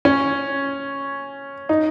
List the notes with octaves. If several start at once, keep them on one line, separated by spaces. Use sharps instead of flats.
C#4
D#4